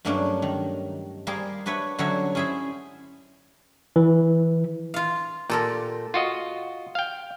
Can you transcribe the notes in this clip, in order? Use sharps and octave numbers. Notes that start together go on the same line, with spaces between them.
G2 F#3 A3 A#3 C#4 D4
D#3
G3 A#3 G#4 A#4 C5
D4 F#4 B4 C#5 E5
D3 F#3 G3 C#4 C#5 E5
C#4 E4 G#4 C5 E5
E3
F4 F5
A#2 G4 A4 A#4
F4 F#4 D#5
F5 G5